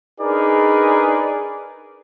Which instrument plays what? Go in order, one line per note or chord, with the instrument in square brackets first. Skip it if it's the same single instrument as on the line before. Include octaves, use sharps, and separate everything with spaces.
[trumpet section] D4 D#4 G#4 A#4 B4 D5